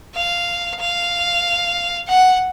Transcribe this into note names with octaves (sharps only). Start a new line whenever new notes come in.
F5
F5
F#5